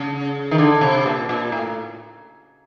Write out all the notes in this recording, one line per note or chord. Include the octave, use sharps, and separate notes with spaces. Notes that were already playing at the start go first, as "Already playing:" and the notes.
Already playing: C#3
D#3
D3
C3
A#2
A#2
A2